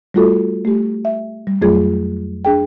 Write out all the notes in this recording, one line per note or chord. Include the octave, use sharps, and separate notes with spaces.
G3 A3 F4 F#4 A4
A3 G4
E5
G3
F2 F#3 A3 F4 G#4 G#6
D4 G#4 G5